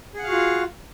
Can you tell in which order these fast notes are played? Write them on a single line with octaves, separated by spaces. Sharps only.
G#4 F#5 F5 F#4 F4